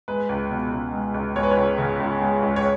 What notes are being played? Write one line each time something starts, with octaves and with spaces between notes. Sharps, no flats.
G#3 B4
C#2
B2
C#2
G#3
C#2
G#3 C#5
B4
C#5
C#2
C#3
C#2
G#3
C#2
C#5